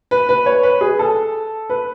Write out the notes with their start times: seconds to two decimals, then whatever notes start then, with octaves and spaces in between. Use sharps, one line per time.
0.11 B4
0.29 B4
0.46 C#5
0.63 B4
0.81 G#4
0.99 A4
1.70 B4